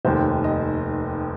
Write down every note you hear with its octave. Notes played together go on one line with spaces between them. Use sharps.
F1 D#2 D#3 C5
D#5